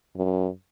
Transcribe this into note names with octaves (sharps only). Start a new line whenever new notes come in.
F#2